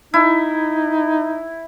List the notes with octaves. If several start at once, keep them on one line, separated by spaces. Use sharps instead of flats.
D#4 E4